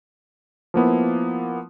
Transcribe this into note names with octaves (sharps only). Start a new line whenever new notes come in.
F3 A#3 B3 E4